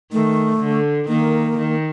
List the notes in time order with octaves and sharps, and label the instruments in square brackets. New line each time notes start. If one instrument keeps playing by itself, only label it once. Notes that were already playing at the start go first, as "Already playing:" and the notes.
[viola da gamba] D#3 [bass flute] A3
[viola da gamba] D3
[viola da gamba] D#3 [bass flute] A#3
[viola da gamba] D#3